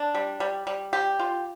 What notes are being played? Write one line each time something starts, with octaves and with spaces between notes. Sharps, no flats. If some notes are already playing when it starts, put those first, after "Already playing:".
Already playing: D4
G3
G3
G3
G4
F4